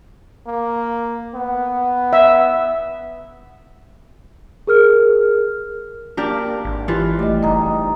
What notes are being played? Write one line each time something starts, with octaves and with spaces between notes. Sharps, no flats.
A#3
B3
E5
G#4 A#4 F6
A#3 D4 G4 A#4
G#1
E3 F4 G4
G3 A3 D#5
F#1 D#4 D#5 A#5